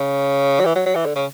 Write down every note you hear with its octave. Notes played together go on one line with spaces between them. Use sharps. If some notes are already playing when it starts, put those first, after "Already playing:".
Already playing: C#3
F#3
E3
F#3
F#3
E3
D3
C#3